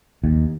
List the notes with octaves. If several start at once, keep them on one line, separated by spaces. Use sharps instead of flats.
D#2